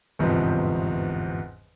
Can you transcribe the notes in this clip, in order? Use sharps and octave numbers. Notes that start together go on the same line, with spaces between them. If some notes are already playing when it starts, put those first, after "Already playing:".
G1 E2 G#2 C3 F3